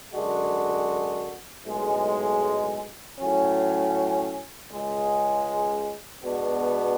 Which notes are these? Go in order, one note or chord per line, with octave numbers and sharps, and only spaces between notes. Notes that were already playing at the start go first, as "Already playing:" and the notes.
F#2 D3 G#3 D4 F#4
B1 A2 G#3
A2 F#3 C#4
C#2 C#3 G#3
B2 G#3 B3 D4 F#4